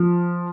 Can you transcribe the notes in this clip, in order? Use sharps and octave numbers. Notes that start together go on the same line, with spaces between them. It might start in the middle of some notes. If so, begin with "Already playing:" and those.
Already playing: F3